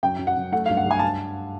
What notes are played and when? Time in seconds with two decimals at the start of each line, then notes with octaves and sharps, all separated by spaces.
0.03 F#2 G5
0.19 F#2
0.27 F#5
0.36 F#2
0.52 A3 F#5
0.66 F5
0.70 G2
0.77 F#5
0.86 G2 G#5
0.99 A5